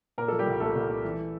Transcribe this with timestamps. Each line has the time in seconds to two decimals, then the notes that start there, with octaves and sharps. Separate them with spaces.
0.18 A#2 A#3 A#4
0.28 F3 A4
0.39 G3 G4
0.47 C2
0.60 A#2 A3 A4
0.75 C2
0.89 C2
1.04 E3